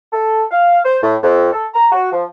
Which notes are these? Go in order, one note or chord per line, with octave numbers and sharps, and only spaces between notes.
A4
F5
C5
A2
F2
A4
A#5
F#4
F3